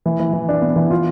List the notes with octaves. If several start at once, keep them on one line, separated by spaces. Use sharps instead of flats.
E3
E3
E3
D4
B3
E3
F4